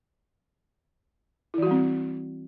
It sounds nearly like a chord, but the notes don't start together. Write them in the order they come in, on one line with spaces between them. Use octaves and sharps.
E4 E3 F#4 G3 C4